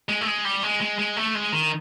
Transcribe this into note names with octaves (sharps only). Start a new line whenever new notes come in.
G#3
A3
G#3
G3
G#3
G#3
G#3
A3
G#3
D#3